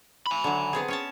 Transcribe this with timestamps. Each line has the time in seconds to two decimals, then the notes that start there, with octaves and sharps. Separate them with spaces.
0.27 G#5 B5
0.44 D3 F#3
0.73 B3 C4 G#4
0.88 C#4 C#5 A5